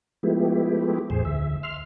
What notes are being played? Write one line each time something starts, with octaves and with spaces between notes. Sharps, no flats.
F3 G#3 A3 B3 E4 G4
E2 A2 G#4 C5
D2 E5
E5 C6 F6